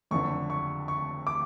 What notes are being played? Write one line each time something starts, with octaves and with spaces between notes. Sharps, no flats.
F#1 F2 D3 C#6
C#6
C#6
D6